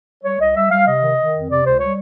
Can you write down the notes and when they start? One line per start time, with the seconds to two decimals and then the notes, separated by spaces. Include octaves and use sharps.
0.23 G3 C#5
0.39 C2 D#5
0.55 G3 E5
0.70 G3 F5
0.86 C3 D#5
1.02 D#3
1.17 D#3
1.34 F2
1.49 C3 D5
1.64 C#2 C5
1.79 G3 C#5